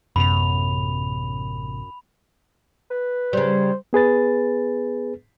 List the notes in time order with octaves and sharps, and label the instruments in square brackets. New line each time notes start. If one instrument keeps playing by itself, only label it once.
[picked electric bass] A1 C3 B3 [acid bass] F#2 [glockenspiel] B5 F7
[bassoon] B4
[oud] C#3 G3 [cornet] C5
[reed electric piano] B3 G#4 B4 A6